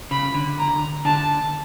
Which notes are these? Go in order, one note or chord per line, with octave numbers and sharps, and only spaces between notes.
C#3 B5
D3
A#5
D3 A5